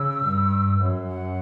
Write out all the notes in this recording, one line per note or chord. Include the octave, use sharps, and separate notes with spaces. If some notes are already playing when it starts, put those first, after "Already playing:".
Already playing: C#3 E6
G2
F#2
F#5